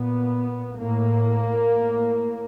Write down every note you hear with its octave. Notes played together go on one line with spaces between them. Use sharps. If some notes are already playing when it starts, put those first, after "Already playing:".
Already playing: A#2 B3
A2 A#3
A2